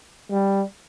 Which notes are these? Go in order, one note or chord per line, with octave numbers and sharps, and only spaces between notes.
G3